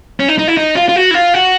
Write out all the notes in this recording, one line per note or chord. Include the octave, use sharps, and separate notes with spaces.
C#4
D#4
D#4
E4
D#4
F4
F4
F#4
E4
F4
F#4